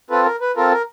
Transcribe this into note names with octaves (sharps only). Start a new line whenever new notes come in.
C4 F4 A4 B4
A#4
B4
C4 F4 A4 A#4
A#4